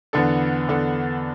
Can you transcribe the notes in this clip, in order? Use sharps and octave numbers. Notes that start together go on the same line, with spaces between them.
E2 D3 B3 D4 A4
E2 D3 B3 D4 A4